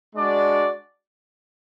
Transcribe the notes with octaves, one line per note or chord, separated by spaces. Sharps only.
G#3 D4 F#4 D5